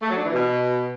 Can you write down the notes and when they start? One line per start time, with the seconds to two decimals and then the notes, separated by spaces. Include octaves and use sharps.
0.02 A3
0.09 F#3
0.17 D4
0.25 E3
0.33 B2